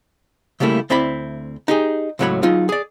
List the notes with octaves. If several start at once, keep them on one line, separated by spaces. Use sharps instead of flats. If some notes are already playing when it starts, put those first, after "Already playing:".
C#3 G3 A3 A#3 E4
D2 C4 E4 D5 B5
D#4 G4 G#4
C#2 A2 F#3 A#4 C#5 B5
F#3 D#4 F4 G#4
G#4 D5